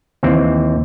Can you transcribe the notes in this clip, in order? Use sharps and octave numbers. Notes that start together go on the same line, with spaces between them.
D#2 E3 C4